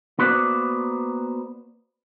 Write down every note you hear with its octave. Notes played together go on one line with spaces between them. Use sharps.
A#3 B3 F#4 B4 C5 D5